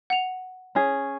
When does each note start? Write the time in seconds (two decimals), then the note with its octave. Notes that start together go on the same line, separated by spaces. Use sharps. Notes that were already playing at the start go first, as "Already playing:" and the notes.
0.10 F#5 F7
0.75 C#4 G#4